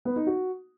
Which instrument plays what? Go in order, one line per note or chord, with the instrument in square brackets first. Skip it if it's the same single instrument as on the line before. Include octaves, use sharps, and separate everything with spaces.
[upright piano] B3
D#4
F#4